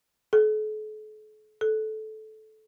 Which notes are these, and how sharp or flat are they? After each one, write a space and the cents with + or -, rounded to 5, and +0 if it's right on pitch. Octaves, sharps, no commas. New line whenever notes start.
A4 -45
A4 -15